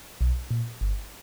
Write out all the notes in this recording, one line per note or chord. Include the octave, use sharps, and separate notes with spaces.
B1
A#2
G1